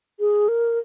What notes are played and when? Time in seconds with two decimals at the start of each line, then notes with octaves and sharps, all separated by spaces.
0.20 G#4
0.48 A#4